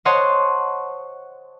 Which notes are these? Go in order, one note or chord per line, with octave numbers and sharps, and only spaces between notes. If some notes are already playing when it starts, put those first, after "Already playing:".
C5 C#5 D#5 F#5 A5 C6